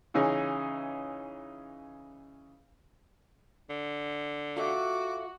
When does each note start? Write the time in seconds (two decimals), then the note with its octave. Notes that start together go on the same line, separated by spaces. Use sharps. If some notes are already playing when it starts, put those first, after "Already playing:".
0.14 C#3 E3 C#4 D#4 G#4
3.70 D3
4.56 F4 F#4 A4 E5 D6